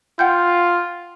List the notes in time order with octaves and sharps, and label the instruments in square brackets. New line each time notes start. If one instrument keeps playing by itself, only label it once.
[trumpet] F4 [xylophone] F#5 G5 G6